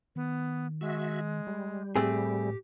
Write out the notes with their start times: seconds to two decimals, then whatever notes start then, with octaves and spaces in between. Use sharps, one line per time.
0.16 D#3 B3
0.81 G#3 F#4 E5
1.47 G3
1.96 A2 A3 C4 G4 G#4